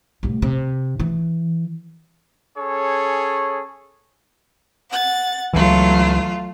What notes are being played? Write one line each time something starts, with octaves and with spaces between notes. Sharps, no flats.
C2 A2
C3
E3
C#4 G#4 A4 C#5
F#5 A6
C#2 E3 F#3 A3 F4